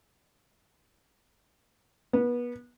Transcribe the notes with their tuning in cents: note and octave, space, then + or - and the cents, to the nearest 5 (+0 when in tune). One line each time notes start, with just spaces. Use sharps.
B3 -25